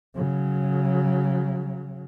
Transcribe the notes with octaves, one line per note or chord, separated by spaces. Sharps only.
C#3 F#3